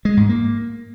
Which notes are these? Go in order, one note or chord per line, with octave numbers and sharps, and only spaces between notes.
G#3
G#2
A#3